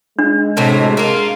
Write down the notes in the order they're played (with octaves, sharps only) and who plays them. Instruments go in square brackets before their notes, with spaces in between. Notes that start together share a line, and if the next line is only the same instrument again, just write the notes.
[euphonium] G#3 [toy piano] D4
[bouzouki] A2 C3 F#3
A#3 F4